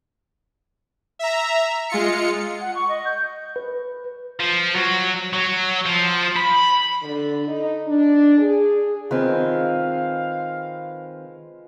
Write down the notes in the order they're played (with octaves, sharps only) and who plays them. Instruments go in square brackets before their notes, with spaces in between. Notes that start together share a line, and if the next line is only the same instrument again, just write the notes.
[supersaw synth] E5 A#5
G#3 F4 C#7
[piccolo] F#5
C#6
D#5
G6
[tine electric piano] B4
[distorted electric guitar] F3
F#3
F#3
F3
B5
[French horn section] D3
D#4
D4
G#4
[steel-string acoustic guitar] D#3 C4 [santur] G#3 F4 B4 [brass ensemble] F5